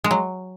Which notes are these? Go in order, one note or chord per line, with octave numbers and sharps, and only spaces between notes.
G#3
F#3